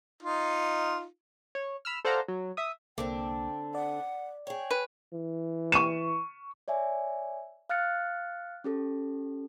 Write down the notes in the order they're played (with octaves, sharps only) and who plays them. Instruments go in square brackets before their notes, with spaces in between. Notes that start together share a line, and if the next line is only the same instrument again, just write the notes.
[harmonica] D#4 F4
[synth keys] C#5
B5 E6 F6
A4 C5 D5 F5 F#5 A#5
F#3
E5 D#6
[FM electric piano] C2 A#3 D6 [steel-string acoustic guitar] D3 C4 D4 [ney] G5
[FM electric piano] D5 [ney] F#5
[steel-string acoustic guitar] G#4 C#5 [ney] G5
[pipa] B4
[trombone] E3
[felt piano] C#6 D#7 E7
[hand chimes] C#5 D5 E5 G#5
F5 F6 F#6 A6 C#7
C#4 G4 A4